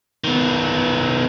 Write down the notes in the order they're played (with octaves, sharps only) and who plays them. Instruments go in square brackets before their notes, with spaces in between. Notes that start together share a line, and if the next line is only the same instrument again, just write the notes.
[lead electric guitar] D#3 B3